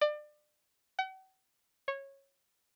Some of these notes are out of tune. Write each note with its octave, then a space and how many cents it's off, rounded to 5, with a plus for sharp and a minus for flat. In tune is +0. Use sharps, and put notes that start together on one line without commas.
D5 +30
F#5 +45
C#5 -15